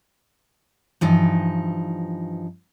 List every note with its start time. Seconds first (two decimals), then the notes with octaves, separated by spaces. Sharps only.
1.01 G2 E3 F3 D#4